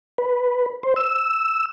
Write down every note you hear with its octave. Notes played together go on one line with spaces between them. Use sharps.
B4
C5
E6